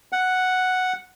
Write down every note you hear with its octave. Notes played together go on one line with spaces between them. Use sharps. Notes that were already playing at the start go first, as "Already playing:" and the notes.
F#5